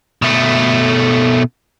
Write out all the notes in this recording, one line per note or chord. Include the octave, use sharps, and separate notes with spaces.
B2 A3